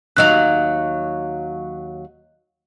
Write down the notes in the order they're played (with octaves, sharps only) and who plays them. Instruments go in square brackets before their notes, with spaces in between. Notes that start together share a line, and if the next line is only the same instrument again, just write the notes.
[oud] D#2 F#3 F5 [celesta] D#5 F#6